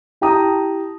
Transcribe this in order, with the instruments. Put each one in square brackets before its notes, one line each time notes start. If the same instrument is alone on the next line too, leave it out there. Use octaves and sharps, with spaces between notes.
[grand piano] E4 G4 G5 A5 A#5 D#6